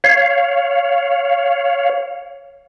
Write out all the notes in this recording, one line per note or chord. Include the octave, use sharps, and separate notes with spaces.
C#5 F5